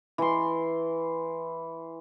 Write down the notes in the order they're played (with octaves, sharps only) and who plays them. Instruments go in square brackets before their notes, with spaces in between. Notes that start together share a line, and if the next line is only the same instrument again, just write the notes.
[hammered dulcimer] E3 C6